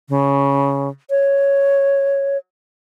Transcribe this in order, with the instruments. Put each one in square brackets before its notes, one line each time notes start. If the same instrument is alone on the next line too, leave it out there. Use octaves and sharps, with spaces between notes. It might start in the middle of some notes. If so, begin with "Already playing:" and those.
[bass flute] C#3
C#5